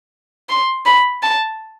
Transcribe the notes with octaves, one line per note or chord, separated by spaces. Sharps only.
C6
B5
A5